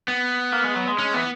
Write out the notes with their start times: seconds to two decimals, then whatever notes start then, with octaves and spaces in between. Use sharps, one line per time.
0.08 B3
0.53 A#3
0.64 G#3
0.76 F#3
0.88 G#3
0.99 G#3 C#4
1.14 E3 B3